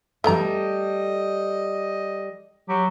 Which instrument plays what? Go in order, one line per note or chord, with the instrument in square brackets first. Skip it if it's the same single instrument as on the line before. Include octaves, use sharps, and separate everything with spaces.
[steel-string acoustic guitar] G3 A4 [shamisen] A3 B3 A#5 [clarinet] D#5
[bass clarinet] F#3 [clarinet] G4